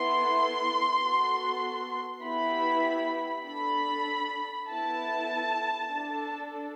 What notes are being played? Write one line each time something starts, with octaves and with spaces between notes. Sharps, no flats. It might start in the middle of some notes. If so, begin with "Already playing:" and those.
Already playing: B3 E4 A4 C6
B3 F#4 A4
B3 E4 G4 B5
D4 A4 B5
B3 E4 A4 A5
D4 A4